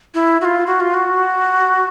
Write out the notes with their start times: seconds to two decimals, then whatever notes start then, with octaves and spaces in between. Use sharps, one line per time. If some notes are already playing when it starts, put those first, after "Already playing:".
0.14 E4
0.41 F#4
0.45 F4
0.67 F#4
0.80 F4
0.94 F#4